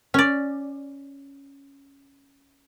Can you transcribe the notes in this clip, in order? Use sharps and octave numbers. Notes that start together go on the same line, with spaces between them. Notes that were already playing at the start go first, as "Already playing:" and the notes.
C#4 D5